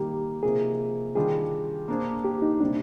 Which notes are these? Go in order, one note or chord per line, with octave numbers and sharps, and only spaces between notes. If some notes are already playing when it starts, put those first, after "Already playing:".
Already playing: D#3 G3 A#3 D#4 G4
C3 F3 A#3 D#4 G#4 A#4
D#3 G3 D4 F4 G#4
A#3 D4 G#4 C5
G4
D#4
C3 G3 A#3 D4